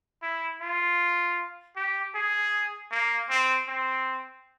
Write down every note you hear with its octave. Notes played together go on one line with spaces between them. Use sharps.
E4
F4
G4
G#4
A#3
C4
C4